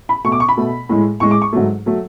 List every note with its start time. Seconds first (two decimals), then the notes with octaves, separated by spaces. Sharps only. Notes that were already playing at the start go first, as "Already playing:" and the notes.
0.09 B5
0.24 B2 A3 C#6
0.32 D6
0.40 C#6
0.49 B5
0.57 B2 A3
0.89 A2 G#3
1.20 A2 G#3 C#6
1.31 D6
1.42 C#6
1.53 G#2 F#3 A3
1.86 F#3 A3